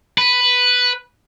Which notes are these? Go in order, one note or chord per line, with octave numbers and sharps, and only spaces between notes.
B4